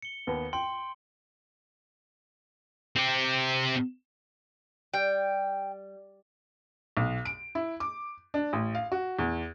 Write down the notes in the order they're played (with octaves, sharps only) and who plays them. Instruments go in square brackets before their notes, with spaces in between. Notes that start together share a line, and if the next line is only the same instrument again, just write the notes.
[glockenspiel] C#7 G7
[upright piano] D#2 B3
[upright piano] G5 [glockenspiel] C6
[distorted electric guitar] C4 G4
[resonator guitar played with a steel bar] G3 [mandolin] G5
[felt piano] B1
D7
E4
D6
D4
A1
F5
F#4
E2